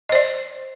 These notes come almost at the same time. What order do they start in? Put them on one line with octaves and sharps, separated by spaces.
D#5 C5 D5